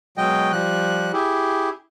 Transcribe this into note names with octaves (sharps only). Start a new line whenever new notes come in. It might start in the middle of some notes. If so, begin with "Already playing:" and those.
B2 F#3 G#3 D#5 G5
F3 G3 F#6
E4 G4 G#4